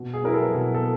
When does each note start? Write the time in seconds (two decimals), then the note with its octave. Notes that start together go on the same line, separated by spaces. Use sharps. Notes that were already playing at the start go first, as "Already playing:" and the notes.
Already playing: B2
0.14 G#4
0.23 F#3 B3 E4 A#4
0.34 A4
0.54 B2
0.74 A4